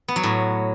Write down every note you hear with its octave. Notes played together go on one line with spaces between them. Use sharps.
B3
F#3
A2